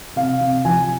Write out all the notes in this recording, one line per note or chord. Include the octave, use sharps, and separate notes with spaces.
C3 F5
C3
F3 G#5